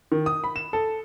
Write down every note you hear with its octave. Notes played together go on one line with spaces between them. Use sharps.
D#3
D#6
B5
E7
A4